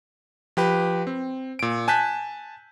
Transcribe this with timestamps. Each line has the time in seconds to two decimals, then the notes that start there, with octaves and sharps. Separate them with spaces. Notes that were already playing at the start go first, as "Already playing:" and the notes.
0.57 F3 G4 B4
1.07 C4
1.59 A#2 D7
1.88 G#5 A5 F#6 G6 B6